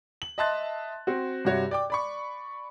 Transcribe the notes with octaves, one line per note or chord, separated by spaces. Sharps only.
F#7
D#5 E5 A5 C6 F#6 A6
C4 F#4
G2 C3 F#4 C#5 E5
D5 G5 D6
D5 B5 C#6